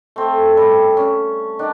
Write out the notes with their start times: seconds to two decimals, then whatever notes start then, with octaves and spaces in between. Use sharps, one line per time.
0.16 A3 C4
0.57 G3
0.97 C#4
1.59 D#3 D4